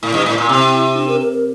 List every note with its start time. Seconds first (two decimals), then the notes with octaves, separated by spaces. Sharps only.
0.03 A2 E4
0.14 G2
0.26 A2
0.38 A#2
0.49 C3
0.97 D4
1.08 A#4
1.20 A#4
1.32 A#4